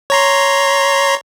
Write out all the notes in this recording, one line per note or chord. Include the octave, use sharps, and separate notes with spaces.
C#5 A#5 C6